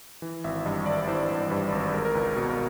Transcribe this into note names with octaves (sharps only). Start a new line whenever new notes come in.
E3
G#1 E5
G2 D#5
G#1 D5
E3 C5
G#1
G2 B4
G#1
B4
G#3 A#4
A#4
C#2 B4
B2 B4
A#4